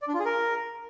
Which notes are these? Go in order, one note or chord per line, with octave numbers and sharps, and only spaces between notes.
D5
D4
F4
G#4
A#4